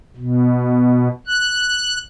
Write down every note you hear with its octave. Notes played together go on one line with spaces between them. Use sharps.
B2
F#6